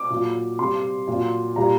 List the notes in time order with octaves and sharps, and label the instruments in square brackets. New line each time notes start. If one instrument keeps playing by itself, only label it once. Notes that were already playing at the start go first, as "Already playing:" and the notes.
Already playing: [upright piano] D6
A#2 F#3
C3 G3 C6
A#2 F#3
A#2 G3 A#5